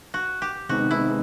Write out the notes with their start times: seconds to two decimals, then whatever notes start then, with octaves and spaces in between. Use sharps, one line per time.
0.14 F#4
0.42 G4
0.69 C3 D#3 G#3 B3 D#4 F#4
0.91 E4